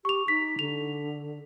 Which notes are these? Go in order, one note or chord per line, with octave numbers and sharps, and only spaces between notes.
G4 C#6 F7
D#4 B6
D3 F7